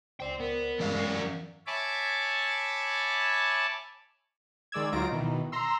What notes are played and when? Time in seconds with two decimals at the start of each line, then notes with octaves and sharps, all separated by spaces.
0.20 C#2 C5 D5 G5 C6
0.40 B3 A#4
0.80 G2 E3 G#3 D5 F5
0.96 F#2 C#4
1.67 C#5 E5 G#5 A5 B5 D6
4.72 D#3 G#3 D5 E6 G#6
4.93 D2 F#3 D#4 F4 A#6 D7
5.12 B2 D#3 E3
5.52 A#5 C6 E6